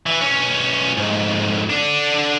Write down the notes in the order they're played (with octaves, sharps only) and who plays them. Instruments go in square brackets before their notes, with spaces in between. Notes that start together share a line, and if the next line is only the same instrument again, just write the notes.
[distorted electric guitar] E3
B1 C#4
F2 G#2
D3 D4